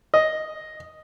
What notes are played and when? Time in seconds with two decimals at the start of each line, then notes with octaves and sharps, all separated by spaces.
0.14 D#5